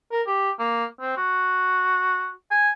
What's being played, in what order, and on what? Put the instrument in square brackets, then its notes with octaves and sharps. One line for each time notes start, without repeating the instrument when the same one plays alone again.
[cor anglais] A#4
G4
A#3
C4
F#4
G#5